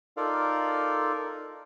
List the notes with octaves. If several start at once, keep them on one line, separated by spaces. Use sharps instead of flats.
D#4 F4 A4 A#4 D5 F5